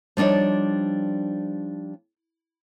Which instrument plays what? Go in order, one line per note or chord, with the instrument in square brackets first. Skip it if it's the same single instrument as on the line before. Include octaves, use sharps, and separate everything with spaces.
[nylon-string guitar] F3 G3 D4 D#4 C#5